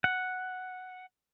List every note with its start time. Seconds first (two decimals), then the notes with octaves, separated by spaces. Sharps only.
0.04 F#5